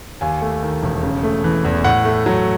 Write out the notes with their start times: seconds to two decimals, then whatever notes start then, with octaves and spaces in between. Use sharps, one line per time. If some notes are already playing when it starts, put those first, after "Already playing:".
0.21 D#2 G#5
0.42 A3
0.62 D#3
0.83 E1
1.03 C#3
1.23 A3
1.44 E3
1.65 E2
1.84 A2 F#5
2.05 A3
2.26 F#3